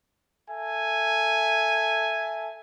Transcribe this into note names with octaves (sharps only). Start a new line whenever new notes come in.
A4 E5 G#5